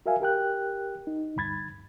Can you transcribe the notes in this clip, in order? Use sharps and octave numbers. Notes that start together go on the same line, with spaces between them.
F#4 A#4 E5 F5 G#5
G4 A#4 G5 F#6
D#4
D2 G2 B5 G#6 A6